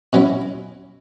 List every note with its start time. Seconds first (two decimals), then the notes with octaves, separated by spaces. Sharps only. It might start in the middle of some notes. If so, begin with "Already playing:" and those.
0.13 B2 F#3 C#4 E4